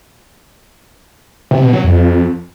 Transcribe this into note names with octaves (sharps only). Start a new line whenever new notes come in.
C3
B2
F#3
F2